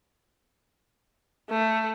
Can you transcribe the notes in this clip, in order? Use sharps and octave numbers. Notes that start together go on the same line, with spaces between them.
A3